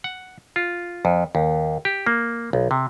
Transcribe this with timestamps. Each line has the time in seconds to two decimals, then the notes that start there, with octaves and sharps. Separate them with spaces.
0.04 F#5
0.56 F4
1.05 F2
1.35 D#2
1.85 G4
2.07 A#3
2.53 B1
2.71 C3